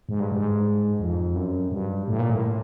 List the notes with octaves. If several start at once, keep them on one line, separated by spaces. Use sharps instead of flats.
G#2
G2
G#2
F2
F#2
G2
A2
A#2
A2